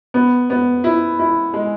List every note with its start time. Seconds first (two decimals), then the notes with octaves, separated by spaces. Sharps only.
0.14 B3
0.50 B3
0.84 E4
1.19 E4
1.54 G#3